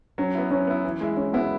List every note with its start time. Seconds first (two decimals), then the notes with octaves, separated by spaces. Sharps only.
0.18 F#3 C#4
0.35 B3 E4
0.51 F#3 C#4
0.67 B3 E4
0.84 E3
1.01 G#3 E4
1.17 E3 C#4
1.33 G#3 B3 E4